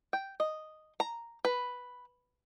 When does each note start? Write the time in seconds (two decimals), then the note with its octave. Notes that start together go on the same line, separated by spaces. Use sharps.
0.13 G5
0.40 D#5
1.00 A#5
1.45 B4